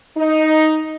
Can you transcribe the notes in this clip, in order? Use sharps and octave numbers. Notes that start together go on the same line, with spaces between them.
D#4